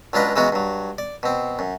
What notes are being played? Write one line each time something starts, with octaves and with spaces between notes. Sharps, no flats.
C#2 F#3 D4 F4 B4 D#5
C#3 E3 G#3 B3 D#4 F#4
G2 F#3
D5
B2 C4
F#2